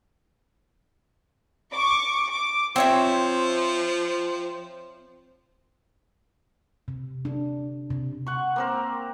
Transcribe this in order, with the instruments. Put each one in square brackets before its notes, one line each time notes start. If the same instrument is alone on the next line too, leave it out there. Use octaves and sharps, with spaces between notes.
[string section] C#6 D6
D6
[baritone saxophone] F3 [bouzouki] C4 C#5 E5
[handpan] C3
D4
C3
[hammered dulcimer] F#5 C#6
A#3 C4 A#4